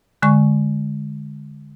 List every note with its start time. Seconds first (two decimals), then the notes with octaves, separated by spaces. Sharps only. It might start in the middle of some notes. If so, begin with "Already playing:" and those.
0.22 D3 G#3 C#6